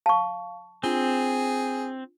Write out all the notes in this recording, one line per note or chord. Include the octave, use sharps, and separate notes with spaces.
F5 A5 C#6
C4 D4 F4 G#4 G7